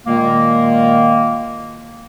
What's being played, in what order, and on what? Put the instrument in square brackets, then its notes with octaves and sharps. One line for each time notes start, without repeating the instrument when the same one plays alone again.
[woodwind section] A#2 D#3 G#3 A#3